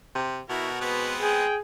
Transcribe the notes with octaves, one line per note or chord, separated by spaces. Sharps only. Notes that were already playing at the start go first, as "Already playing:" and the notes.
C3
B2 E4 F#4 A#4
G#3 B3 C4 B4
G#4 G5